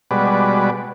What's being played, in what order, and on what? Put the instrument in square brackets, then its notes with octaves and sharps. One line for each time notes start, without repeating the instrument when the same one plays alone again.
[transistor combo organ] B2 G3 G#3 F#4 B4 D5